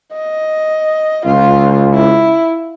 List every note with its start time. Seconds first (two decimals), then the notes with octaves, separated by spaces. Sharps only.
0.14 D#5
1.26 C#2 F4
1.94 E4